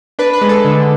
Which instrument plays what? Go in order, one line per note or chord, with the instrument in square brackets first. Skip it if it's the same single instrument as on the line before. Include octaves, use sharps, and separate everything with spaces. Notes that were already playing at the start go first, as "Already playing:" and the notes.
[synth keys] D4 B4
B4
G#3
A4
D3